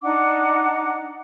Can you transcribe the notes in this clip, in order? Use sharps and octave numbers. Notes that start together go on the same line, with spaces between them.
D4 D#4 F#5 D6